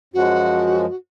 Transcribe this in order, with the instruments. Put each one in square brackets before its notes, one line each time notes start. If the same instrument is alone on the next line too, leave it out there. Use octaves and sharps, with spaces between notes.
[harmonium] F#2 F3 G#3 [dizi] F#4